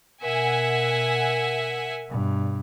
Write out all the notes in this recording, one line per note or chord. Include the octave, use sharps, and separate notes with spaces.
B2 A#4 E5 F#5 G#5
G2 B2